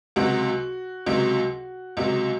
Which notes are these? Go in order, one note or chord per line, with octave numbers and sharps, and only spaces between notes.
C#2 C3 F#3 F#4
C#2 C3 F#3
C#2 C3 F#3